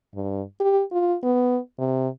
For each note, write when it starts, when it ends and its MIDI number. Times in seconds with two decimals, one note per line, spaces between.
0.14 0.42 43
0.60 0.82 67
0.92 1.16 65
1.23 1.59 59
1.79 2.08 48